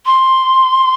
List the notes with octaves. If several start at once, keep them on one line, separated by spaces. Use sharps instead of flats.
C6